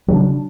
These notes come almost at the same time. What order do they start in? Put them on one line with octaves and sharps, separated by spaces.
F#3 C#3 D4